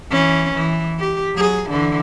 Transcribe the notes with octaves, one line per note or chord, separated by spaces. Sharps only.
E3 C#4
E3
G4
F#3 G#4
D3 E3